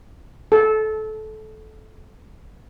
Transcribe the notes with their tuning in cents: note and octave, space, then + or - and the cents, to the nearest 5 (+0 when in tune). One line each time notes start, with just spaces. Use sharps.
A4 -20